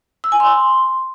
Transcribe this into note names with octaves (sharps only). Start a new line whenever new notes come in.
E6
G#5
C6